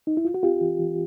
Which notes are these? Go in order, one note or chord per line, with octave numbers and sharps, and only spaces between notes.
D#4
E4
F4
F#4
C4 F4 G4
E3
E3